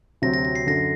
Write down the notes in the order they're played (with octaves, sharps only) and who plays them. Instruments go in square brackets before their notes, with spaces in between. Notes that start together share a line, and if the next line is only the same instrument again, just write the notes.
[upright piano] D2 C3 F#3 C4 [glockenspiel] A#6
[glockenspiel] A#6
A#6
C7
[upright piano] F#2 D3 [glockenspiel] A#6